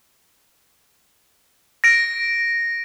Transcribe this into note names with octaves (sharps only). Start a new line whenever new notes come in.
A#6 D7